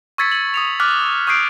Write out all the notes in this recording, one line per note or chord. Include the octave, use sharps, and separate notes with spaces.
C#6 E6 G#6 A6 B6 C#7
C#7 F#7
D#6 C#7 F7
D6 F6 F#6 A6 B6
C#6 D#6 F#6 G6 C7 D7